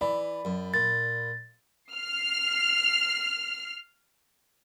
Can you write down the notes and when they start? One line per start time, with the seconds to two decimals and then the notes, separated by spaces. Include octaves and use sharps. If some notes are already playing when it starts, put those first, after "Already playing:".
0.01 E3 D5 B5
0.45 F#2
0.74 A#2 A6
1.92 F6 C7